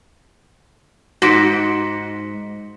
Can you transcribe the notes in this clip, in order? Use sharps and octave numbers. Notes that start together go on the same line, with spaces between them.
G#2 F#4 A#6 B6 C#7 D7 E7